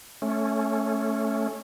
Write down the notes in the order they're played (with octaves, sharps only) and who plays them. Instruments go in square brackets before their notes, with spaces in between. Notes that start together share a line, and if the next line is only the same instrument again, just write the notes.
[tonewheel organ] A3 C#4